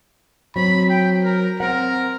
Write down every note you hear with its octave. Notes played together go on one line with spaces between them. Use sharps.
F#3 C4 B5
G5
A#4
C4 A#4 F#5